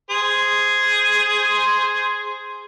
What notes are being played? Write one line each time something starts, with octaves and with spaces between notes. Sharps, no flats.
G#4 C5